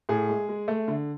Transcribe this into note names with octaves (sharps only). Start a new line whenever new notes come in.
A2 G#4
G#3
G#3
A3
D3